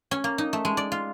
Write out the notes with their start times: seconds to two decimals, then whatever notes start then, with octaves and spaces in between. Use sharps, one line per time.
0.11 C#4
0.24 A#3
0.38 D#4
0.53 A3
0.65 G#3
0.77 D5
0.92 F4